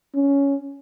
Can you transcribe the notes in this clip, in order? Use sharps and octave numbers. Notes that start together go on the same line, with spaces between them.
C#4